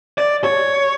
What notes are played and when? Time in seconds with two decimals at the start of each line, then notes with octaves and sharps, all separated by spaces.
0.18 D5
0.44 C#5